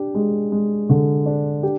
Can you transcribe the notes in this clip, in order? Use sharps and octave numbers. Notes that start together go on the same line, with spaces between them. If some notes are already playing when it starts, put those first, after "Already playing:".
Already playing: D4 G4
G#3
G#3
D3
D4
G4